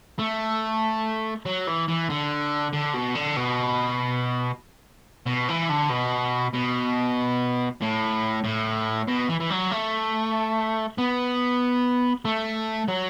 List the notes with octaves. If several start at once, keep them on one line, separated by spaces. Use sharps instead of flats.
A3
F#3
E3
E3
D3
D3
B2
D3
B2
B2
E3
D3
B2
B2
A2
A2
B2
E3
E3
F#3
A3
B3
A3
F#3